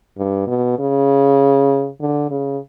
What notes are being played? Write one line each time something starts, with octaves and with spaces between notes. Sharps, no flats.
G2
B2
C#3
D3
C#3